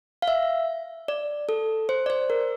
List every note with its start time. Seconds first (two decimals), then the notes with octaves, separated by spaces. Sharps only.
0.22 F5
0.28 E5
1.08 D5
1.49 A4
1.89 C5
2.06 D5
2.10 C5
2.30 A#4